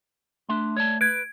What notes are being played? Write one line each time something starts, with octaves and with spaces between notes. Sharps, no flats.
A3 D4 E5 C6
C#5 D5 A5
B4 G#6 D7